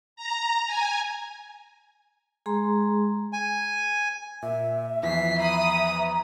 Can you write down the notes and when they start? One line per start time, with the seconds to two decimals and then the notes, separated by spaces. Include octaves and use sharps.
0.16 A#5
0.67 G#5
2.46 G#3 G#4 A#5 C6
3.33 G#5
4.42 A#2 E5
5.03 E2 E3 F3 B6 C7
5.39 A#5 B5 D#6